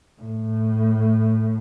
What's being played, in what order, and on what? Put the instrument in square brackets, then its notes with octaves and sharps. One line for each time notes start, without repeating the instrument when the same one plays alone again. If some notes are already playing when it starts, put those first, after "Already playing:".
[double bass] A2